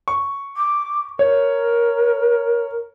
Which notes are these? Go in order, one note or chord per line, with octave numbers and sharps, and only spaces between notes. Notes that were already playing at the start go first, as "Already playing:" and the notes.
C#6
D6
A#4 C#5